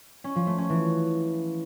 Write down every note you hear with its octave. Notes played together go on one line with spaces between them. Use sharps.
C#4
F3
A3
C#4
E3